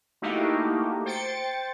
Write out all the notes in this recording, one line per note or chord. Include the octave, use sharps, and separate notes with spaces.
A3 A#3 D#4 E4 F#4 G4
C5 G5 A6 C#7